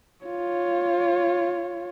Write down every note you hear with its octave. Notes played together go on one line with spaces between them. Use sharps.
F4 C#5